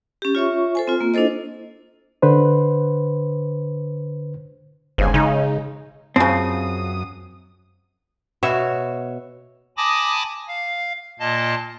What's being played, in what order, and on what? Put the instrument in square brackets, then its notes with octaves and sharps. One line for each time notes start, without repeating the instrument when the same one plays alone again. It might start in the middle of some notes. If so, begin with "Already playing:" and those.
[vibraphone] C#4 G4
F4 C#5 E5 C#6
A4 C5 G#5
C4 F4
A#3 F4
D4 E4 A4 C5 D#5
[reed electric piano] D3 B4 C5
[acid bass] G1 [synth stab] G#2 C#3 G#5
[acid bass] C#3 [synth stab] G#3 D#4
[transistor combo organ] F#2 D#6 [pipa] C#3 F3 [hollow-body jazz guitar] C4
[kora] B2 F#4 C#5 E5
[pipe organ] G#5 A5 B5 D6 D#6 A#6
F5
A#2 A#3 D#5 A5